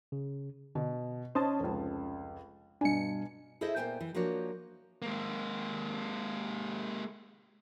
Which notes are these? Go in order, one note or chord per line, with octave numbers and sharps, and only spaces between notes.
C#3
B2 D3
C#4 C5 D#5 A5
F1 C#2
G2 B2 D4 G#5 C#7
E4 G#4 A4 C5 D#5 E5
A#2 B3 C5 G5 G#5
E3
F3 A#3 D4 F#4 C#5
G#3 A#3